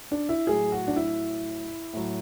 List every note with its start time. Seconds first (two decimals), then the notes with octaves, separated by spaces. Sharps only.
0.12 D4
0.29 E4
0.47 A2 F#3 G#4
0.72 F#4
0.88 D4
0.96 E4
1.93 A2 F#3